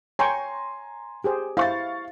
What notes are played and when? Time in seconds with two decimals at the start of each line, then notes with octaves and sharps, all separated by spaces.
0.19 C#5 G5 G#5 A#5 C6 C#6
1.24 G4 G#4 C5
1.57 E4 C5 F5 C#6 A6